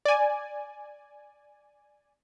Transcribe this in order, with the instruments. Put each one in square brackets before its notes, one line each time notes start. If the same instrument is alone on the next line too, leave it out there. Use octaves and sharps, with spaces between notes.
[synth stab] D5 G#5